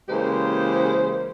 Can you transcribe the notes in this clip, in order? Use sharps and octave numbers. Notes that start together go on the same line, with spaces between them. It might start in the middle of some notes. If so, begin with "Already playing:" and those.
C#3 E3 G#3 A#3 G4 C5